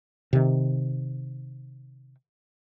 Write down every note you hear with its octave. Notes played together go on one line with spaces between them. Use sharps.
C3 D#3